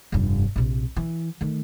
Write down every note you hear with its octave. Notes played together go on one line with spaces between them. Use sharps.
F1 G2
A#1 C3
E3
D#3 A3